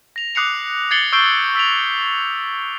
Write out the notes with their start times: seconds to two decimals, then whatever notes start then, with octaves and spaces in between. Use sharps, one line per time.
0.16 A#6 F7
0.35 D6 D#6 F#6 C7 C#7 F7
0.91 G#6 A6 C7 C#7 F#7 G7
1.12 C#6 E6 G6 C7 D7 G7
1.55 E6 B6 D7 F7